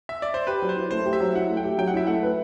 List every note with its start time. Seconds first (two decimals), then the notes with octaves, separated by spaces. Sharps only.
0.09 E5
0.22 D5
0.34 C5
0.47 G4 B4
0.62 F#3
0.69 C5
0.76 E4
0.91 A3 C5
1.06 G4
1.13 E5
1.21 F#3
1.35 E4 F#5
1.50 A3
1.57 G5
1.64 G4
1.78 F#3 G5
1.88 F#5
1.94 E4 E5
2.07 A3 F#5
2.23 B4